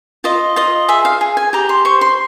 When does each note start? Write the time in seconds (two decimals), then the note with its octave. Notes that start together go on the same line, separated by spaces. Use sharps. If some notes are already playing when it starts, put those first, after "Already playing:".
0.24 F4 D#5
0.56 F4 D#5
0.89 G#4 E5
1.05 F5
1.21 G#4
1.37 G#5
1.53 G4 A#5
1.69 C6
1.85 C5 C#6
2.01 C6